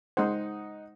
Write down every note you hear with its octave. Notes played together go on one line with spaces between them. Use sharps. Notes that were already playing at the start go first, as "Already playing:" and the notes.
G#3 D#4 C5 F#5